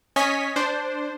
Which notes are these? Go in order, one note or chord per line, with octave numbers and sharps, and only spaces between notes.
C#4 C#5 D#5 G#5 B6
D4 C5